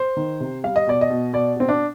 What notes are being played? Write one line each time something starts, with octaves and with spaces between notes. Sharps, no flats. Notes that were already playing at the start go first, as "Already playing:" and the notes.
Already playing: C5
D#3
C3
G3 F5
D#5
B2 D5
D#5
B2
B2 D5
B2 C4
D4